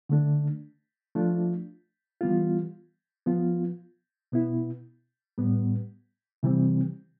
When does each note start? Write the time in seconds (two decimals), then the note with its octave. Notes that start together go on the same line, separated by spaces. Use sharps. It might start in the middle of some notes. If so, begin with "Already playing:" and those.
0.09 D3 A3 D4
1.15 F3 A3 D4 F4
2.21 E3 G3 B3 F4
3.26 F3 B3 F4
4.32 B2 B3 E4
5.38 A2 G3 B3
6.43 C3 E3 G3 C4